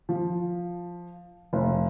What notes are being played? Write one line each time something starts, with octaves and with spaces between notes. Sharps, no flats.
F3
F1